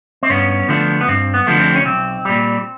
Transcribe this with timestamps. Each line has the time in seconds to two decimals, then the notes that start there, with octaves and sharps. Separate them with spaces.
0.23 C4
0.30 G2 B3 C#4
0.69 D3 F3 A3
1.01 B3
1.08 G2 C4
1.34 B3
1.47 D3 F3 A3
1.60 C4
1.76 C#4
1.85 B1 C4
2.25 A#2 G3